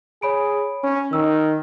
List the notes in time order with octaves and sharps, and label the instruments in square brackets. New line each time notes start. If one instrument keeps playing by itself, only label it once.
[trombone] G#4 [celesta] C#5 B5 D7
[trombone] C#4
[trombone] D#3 [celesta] E6